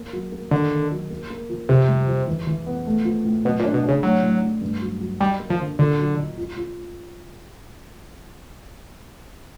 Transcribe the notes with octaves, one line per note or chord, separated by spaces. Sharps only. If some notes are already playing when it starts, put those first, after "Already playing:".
Already playing: A#3
F#3
A#3
D3 D#3
D#3
F#3
A#3
A#3
F3
F2 C3
G3
F2
E3
E3
B3
A3
F3
A2
B2 F#3
A#2
D4
B2
D4
C#3
A2 F#3
A2
A2
G2
F#3
F#3
G3 D#4
A#3
F3
D3
A#2 D3
F#3
D#4
F4
F4